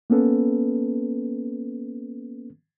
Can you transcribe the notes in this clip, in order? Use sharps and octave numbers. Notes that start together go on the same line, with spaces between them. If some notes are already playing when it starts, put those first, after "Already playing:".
A#3 B3 C#4 A4 B4